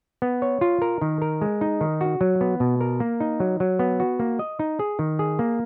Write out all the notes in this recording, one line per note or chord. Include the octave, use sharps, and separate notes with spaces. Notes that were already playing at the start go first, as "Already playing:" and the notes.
B3
C#5
F4
A#4
D#3
A#4
G#3
D#4
D#3
F#4
F#3
B3
B2
A#4
A#3
D#4
F#3
F#3
B3
F#4
A#3
D#5
D#4
G#4
D#3
G#4
A#3